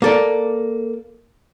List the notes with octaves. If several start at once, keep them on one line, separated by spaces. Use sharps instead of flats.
A#3 A4 D5